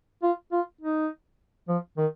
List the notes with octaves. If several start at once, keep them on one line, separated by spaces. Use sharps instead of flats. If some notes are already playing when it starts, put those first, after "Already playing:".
F4
F4
D#4
F3
D#3